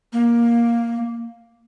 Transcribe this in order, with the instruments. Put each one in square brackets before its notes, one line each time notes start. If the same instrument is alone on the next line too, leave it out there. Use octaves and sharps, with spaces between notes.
[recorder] A#3